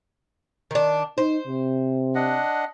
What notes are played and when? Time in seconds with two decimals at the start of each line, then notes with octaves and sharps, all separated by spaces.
0.71 D#3 D4
1.18 D#4 C5
1.47 C3
2.15 D4 D#5 F#5